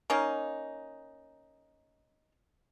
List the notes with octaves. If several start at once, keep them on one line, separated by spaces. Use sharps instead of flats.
A#3 C#4 D#4